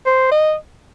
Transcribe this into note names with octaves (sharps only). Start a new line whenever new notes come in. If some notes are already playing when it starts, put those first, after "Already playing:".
C5
D#5